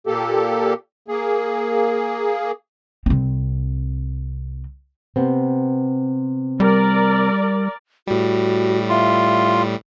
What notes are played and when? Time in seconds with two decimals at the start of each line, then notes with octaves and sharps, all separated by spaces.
0.07 A#2 A#3 G4 A4
1.08 A#3 G#4
3.06 C2 C4
5.16 C3 B3 C4
6.60 G3 A#4 D5
8.07 A2 G3 F#4
8.89 F4 E5